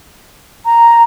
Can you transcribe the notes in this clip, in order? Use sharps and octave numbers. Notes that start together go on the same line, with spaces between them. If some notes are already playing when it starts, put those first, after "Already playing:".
A#5